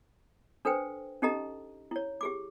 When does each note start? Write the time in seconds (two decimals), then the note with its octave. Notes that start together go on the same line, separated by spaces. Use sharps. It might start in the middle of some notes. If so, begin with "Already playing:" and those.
0.65 D4 A4 B4 C5 G5
1.22 C#4 D#4 G4 A4 D#5 A#5
1.91 E4 C#5
2.21 G4 G#4 D6